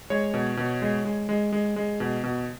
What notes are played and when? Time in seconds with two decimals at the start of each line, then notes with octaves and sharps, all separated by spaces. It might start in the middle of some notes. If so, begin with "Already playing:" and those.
0.10 G#3 C#5
0.34 B2
0.57 B2
0.82 G#3
1.05 G#3
1.29 G#3
1.52 G#3
1.76 G#3
2.00 B2
2.24 B2